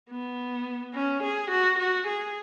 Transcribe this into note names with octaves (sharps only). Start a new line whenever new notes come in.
B3
C#4
G#4
F#4
F#4
G#4